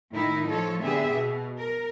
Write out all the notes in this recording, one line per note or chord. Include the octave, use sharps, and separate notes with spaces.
A2 D#3 D#4 E4
F3 A4 C#5
D3 B3 G4 G#4 E5
B2
A#4